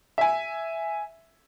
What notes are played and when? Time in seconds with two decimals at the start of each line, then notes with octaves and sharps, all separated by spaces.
0.18 E5 G#5